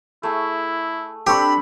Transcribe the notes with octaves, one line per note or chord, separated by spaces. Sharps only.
A3 E4 G#4
C4 D4 G4 A4 B5 C#6